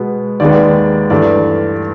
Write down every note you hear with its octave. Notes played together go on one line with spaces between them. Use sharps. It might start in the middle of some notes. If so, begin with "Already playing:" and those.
Already playing: B2 G#3 B3
D#2 D#3 G#3 B3 D5
G2 E3 A3 D5